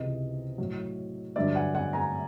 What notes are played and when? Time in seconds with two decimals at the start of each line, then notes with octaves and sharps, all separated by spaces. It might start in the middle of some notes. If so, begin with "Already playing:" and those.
Already playing: C#2 C3 E3 D#5
0.58 A2 F#3
1.36 G2 D3 F#3 D5 E5
1.55 F#5 G#5
1.75 F#5 G#5
1.93 G#5 A#5